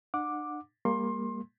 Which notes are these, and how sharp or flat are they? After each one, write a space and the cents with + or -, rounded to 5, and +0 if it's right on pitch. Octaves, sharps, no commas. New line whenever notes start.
D4 +40 F#5 -20 D6 +5
G3 +40 A#3 +0 C6 +25